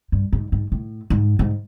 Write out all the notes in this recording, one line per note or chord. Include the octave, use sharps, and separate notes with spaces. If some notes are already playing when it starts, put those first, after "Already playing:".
G2
G#2
G#2
A2
G#2
G#2